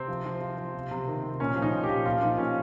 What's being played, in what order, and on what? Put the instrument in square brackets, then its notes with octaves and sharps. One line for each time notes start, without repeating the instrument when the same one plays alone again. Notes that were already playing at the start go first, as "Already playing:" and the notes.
Already playing: [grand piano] C3 C4
F3
F3
F3
F3
C3
C3
D#3
C3
A#2 C#4
F3
D#4
A#2
G4
F3
A#2 F4
F3 D#4
A#2 C#4